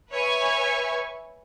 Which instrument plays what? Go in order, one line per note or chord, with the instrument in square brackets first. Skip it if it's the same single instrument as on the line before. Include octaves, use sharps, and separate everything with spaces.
[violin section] B4 C#5 E5 G#5 C#6